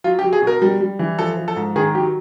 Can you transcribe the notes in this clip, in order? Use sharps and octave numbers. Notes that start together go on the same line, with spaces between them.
F#3 F4
G4
F#3
G#4
B2
A#4
G3
G3
E3
F3 A4
F3
A4
G#2
D#3 G#4
F#3 G4